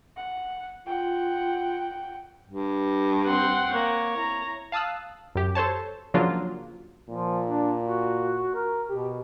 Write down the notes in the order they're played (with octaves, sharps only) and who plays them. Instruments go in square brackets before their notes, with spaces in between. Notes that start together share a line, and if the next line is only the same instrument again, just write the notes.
[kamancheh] F#5
[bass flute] F4 [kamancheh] F#5 G5
[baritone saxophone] G2
[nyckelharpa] C4 C6 [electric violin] F#5 G5
[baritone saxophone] A#3 [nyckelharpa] C#5
[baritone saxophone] E4 [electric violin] A#5
[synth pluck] F5 A5 D#6 E6 F#6
F#2 G4
A4 C5 C#5 A5
C#3 F3 F#3 A#3 D4 F4
[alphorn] A#2 [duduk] F3
[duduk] D4
F#4
A#4
[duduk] B2 [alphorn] G4